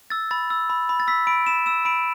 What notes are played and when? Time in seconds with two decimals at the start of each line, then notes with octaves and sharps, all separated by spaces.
0.10 E6 A6
0.31 B5 A6
0.50 E6
0.70 B5
0.89 B5
1.00 A6
1.08 E6 B6
1.27 B5 D7
1.47 B5 E7
1.66 E6 E7
1.85 B5 D7